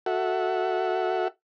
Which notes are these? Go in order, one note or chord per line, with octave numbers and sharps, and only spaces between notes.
F#4 A4 E5 F#5